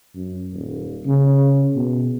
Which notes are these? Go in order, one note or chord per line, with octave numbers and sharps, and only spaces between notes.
F#2
D#1
C#3
B2